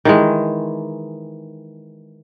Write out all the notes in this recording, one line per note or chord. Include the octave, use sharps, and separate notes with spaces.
D#3 E3 G#3